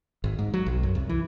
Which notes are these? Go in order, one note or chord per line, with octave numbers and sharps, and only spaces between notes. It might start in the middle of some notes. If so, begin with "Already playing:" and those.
G#1
G#2
F#3
B1
F#2
C2
E3